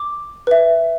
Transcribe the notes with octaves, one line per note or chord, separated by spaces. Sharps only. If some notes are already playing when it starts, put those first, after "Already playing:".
Already playing: D6
B4 E5